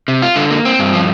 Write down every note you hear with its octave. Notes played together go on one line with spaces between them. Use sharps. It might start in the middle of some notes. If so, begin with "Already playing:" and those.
C3
F4
D3
A#3
C4
G2
F3